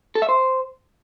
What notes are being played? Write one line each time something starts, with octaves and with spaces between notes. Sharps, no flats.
A4
E5
C5